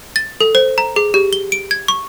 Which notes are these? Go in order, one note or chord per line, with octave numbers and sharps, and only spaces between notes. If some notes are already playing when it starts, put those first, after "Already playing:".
A6
A4
C5
A#5
G#4
G4
G7
D7
G#6
C#6